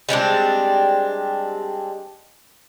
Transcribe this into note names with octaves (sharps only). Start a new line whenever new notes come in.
G3 G#3 C4 D4